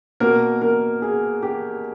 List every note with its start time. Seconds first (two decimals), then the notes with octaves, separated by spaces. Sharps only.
0.20 B2 A#3 A#4
0.62 A#4
1.02 G#4
1.43 G4